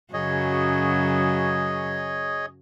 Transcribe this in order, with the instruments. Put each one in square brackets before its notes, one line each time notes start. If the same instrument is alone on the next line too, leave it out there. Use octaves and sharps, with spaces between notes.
[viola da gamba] F#2 C#3 F#3 [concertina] G#4 C#5 D#5